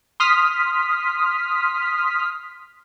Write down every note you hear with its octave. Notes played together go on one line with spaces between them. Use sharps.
C6 D#6 F6 B6